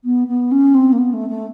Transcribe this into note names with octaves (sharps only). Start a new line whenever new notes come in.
B3
B3
C#4
C4
A#3
B3
A3
A3